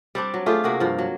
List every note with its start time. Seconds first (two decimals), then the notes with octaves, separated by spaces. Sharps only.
0.15 G3 C4 D4
0.34 F#3
0.46 A3 F4 G4 G#4
0.64 C3 A#3 F#4 G#4
0.80 G2 F3
0.98 F#3